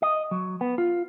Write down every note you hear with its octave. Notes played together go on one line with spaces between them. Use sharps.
D#5
F#3
B3
F4